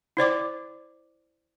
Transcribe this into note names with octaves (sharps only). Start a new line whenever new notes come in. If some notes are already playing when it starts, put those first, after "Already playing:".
E4 C5 D5 D6